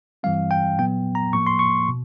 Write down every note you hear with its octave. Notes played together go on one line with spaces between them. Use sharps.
G2 E3 G3 C4 F5
G5
A#2 F#3 B3 G5
A#5
A2 F3 A#3 C#6
C6
C#6
B2